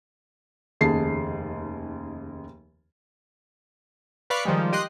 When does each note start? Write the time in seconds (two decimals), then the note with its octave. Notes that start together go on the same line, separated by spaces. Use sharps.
0.81 F1 D#2 C#3 G#4 A5 C7
4.30 B4 D5 F5 B5 C#6 F#6
4.45 D#3 F3 G3 G#3
4.73 G4 D#5 C6 F#6